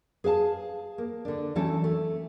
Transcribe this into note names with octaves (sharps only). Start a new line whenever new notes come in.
G#4 B4 F5 A5
A#3
D3 D4
E3 F#3 A3 C#4 A4
A3